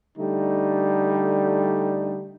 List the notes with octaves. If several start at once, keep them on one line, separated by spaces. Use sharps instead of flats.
D3 G3 A3 D#4